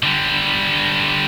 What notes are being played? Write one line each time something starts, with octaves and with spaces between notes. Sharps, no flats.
D3 G3